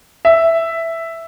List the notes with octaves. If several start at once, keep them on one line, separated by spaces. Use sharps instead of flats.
E5